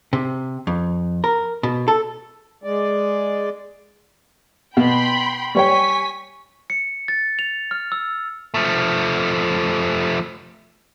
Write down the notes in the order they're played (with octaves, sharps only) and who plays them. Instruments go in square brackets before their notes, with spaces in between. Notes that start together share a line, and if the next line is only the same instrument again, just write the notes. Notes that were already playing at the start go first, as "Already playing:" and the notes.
[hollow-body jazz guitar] C3
F2
A#4
B2
A4
[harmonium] G#3 D5
[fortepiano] B2 [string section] G5 B5 C6
[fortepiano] G3 C#5 G5 [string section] G#5 B6 [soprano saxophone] C#6
[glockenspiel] C#7
A6
F7
F6
E6
[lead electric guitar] F3 A3